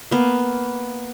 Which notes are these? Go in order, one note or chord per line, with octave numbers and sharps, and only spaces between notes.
A#3 B3